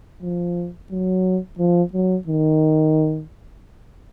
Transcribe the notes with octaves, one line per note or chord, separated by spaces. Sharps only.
F3
F#3
F3
F#3
D#3